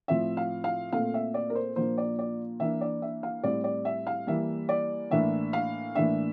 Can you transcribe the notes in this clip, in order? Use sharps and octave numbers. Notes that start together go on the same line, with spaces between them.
A2 F3 C4 E5
F5
F5
A#2 A3 C4 F5
E5
D5
A#4
C5
A#2 F3 A#3 D4 C5
D5
D5
E3 A#3 D4 E5
D5
E5
F5
A2 G3 C4 D5
D5
E5
F5
E3 G3 A#3 E5
D5
A2 E3 A#3 D4 E5
F5
A2 E3 A#3 D4 E5